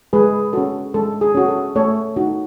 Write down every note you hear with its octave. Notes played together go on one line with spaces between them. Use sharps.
G#3 G#4 B4
C#4 F#4 A4
G#3 A4
G#4
C#4 F#4
A4
A3 A4 C#5
D#4 F#4